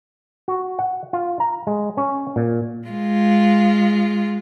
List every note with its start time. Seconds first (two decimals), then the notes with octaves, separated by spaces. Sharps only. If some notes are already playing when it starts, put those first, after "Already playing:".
0.48 F#4
0.79 F#5
1.13 F4
1.40 A#5
1.67 G#3
1.97 C#4
2.36 A#2
2.88 G#3 F4